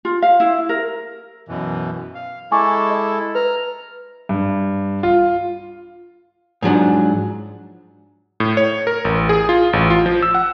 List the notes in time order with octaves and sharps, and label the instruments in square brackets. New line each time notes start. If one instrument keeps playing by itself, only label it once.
[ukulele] F4
F5
E4
A#4
[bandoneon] F#2 B2 E3
F5
[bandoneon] G#3 E4 A4 [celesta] G#5 C#6 D6
[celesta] D#5
[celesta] B4 [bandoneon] A#5 F6
[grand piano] G2
F4
[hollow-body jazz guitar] G#2 F3 F#3 D4
[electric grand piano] A2
C#5
A#4
A1
G#4
F4
A1
F4
F3
E6
F#5